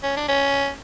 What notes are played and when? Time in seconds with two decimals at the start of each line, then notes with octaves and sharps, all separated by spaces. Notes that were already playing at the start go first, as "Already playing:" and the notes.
0.03 C#4
0.16 D4
0.28 C#4